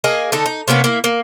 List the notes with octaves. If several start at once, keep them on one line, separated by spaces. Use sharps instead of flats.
A#3 G#4 D#5
D3 D#4 A4
D#4
C3 A#3 B3 C#4
A#3 E4
A#3